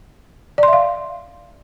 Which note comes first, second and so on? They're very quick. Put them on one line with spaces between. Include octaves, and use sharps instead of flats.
D5 C6 E5 F5